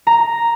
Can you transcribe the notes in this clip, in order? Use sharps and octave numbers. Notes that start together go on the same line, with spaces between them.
A#5